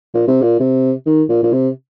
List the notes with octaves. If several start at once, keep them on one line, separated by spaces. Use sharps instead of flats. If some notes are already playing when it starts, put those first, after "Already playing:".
A#2
C3
A#2
C3
D#3
A#2
A#2
C3